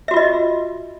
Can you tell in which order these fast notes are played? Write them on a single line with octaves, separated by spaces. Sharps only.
E5 F#4 F4 D#5